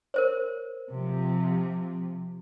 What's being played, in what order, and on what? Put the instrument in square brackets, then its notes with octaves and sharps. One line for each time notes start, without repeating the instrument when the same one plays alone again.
[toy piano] A#4 C5 C#5
[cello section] C3 F3